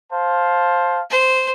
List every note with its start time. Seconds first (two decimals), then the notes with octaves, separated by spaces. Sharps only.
0.12 C5 F5 A5
1.10 C5